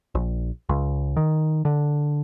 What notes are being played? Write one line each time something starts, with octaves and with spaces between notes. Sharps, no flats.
A#1
C#2
D#3
D3